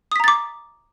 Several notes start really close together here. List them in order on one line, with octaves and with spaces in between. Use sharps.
D#6 B6 A#5 A6 D6